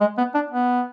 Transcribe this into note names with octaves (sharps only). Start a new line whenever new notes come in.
G#3
B3
D4
B3